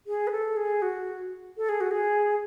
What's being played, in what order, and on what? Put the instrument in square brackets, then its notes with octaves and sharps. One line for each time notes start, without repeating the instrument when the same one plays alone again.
[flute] G#4
B4
A4
G#4
F#4
A4
G#4
F#4
G#4